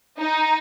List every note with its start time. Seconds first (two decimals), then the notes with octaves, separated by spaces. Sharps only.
0.19 D#4